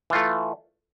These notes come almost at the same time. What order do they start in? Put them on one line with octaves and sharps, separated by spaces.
E3 F4 A3